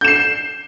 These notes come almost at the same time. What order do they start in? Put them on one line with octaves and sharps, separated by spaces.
G6 E7 C7